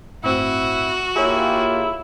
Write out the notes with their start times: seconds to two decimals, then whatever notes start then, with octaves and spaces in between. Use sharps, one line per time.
0.24 G1 A2 C4 E4 F#4
1.16 A#3 E4 F4 G4 G#4 C#5